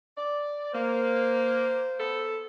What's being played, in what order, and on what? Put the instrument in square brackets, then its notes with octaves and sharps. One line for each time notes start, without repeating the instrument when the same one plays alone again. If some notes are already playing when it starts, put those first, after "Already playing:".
[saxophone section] D5
[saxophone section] A#3 [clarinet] C5
[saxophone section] B3 A4